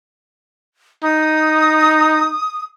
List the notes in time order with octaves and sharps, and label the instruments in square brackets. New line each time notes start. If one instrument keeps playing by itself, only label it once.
[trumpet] D#4 [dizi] D#6